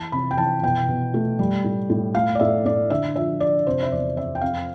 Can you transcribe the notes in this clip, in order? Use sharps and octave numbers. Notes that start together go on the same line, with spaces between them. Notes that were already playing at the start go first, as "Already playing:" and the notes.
Already playing: E3 A5
C3 B5
G5
E3 A5
B2 G5
B2
A3
G3
A2
A2
A3 F5
D5
A2 E5
A2 D5
D3 E5
F3 E5
F3 D5
C3 C5
E5
E2 D5
C3 E5
G5
F2 F5